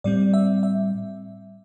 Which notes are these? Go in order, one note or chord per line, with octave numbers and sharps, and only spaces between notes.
A2 G3 C4 D5
E5
E5